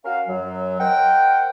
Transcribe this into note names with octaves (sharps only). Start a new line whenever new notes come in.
C#4 F#4 A#4 F5
F#2 F#3
A#4 C5 D#5 F#5 G5